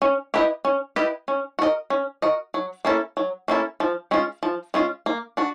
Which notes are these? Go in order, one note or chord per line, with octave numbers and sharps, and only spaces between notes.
C#4
E4 G4 B4 D#5
C#4
E4 G4 B4 D#5
C#4
F#4 A#4 D#5
C#4
F#4 A#4 D#5
F#3
A#3 C#4 E4 A4
F#3
A#3 C#4 E4 A4
F3
G#3 C#4 F4
F3
G#3 C#4 F4
A#3
D4 F#4